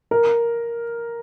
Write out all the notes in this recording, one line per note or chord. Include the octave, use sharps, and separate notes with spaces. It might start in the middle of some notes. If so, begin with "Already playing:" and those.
A#4